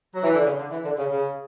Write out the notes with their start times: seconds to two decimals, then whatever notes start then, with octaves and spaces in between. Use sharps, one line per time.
0.14 F#3
0.23 E3
0.34 D3
0.45 C#3
0.58 D3
0.71 E3
0.84 D3
0.97 C#3
1.10 C#3